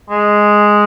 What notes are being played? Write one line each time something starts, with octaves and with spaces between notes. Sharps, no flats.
G#3